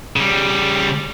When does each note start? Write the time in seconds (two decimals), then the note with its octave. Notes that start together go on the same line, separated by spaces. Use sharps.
0.16 C#3 G3